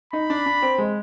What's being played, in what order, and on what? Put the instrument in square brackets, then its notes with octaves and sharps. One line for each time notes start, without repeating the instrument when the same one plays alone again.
[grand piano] D#4 [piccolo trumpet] B5
[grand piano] D4
D4
C4
G#3